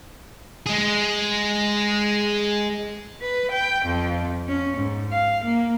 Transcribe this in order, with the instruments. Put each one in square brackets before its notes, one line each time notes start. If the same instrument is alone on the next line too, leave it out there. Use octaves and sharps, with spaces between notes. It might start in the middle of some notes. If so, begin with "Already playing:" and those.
[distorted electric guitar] G#3 G#4
[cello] B4
G5
F2
C#4
G#2
F5
A#3